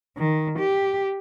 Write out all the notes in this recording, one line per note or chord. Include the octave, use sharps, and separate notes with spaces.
D#3
G4